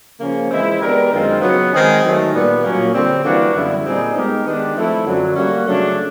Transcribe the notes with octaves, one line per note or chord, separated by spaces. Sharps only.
C#3 F3 A#3 C#4
E3 G#3 C4 E4
G#3 B3 D4 G4 A#4
F#2 D#3 G#3 C4 F4
C#3 F#3 B3
D#3 G#3 C4 D#4 G#4
D#3 F#3 A3
A#2 G3 B3
A#2 F#3 A#3 C#4
D3 G3 C4
E3 G3 A#3 D4 F#4
F#2 D3 G3 B3 E4
A#2 G3 C4 D#4 G#4
G#3 B3 D#4 G4 A#4
D#3 G#3 B3 D4 G4
F3 A3 C4 E4 A4
F#2 D3 F#3
G3 A#3 C#4 F#4
C#3 F#3 A3 D4